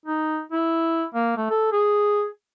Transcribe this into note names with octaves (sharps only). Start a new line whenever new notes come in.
D#4
E4
A#3
A3
A4
G#4